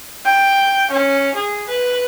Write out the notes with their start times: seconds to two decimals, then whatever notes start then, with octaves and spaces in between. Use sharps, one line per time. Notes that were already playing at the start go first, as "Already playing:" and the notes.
0.25 G5
0.91 C#4
1.35 G#4
1.68 B4